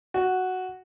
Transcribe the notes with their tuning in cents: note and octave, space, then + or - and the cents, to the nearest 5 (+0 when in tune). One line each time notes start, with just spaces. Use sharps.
F#4 +0